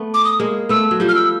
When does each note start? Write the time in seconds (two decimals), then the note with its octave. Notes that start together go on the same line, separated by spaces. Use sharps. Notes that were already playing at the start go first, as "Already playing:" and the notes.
Already playing: A3 B3
0.14 D6
0.25 D#6
0.40 G#3 A#3
0.69 A3 B3 E6
0.91 F#3
1.00 F3 G3
1.09 F6
1.15 E6